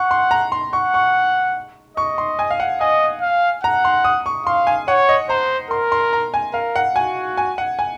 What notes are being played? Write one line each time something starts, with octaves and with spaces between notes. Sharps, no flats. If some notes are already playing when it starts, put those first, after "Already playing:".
Already playing: F#5 C#6
C6
A#5
C6
F#5 C#6
C#6
D#5 C#6
C6
G#5
F5
F#5
D#5 G#5
F5
F#5 A#5
C6
D#6
C#6
F5 C6
G#5
C#5 F#5
D#5
C5 A#5
A#4 C6
C6
A#5
G#5
A#4 F5
F#5
F#4 G#5
G#5
F#5
G#5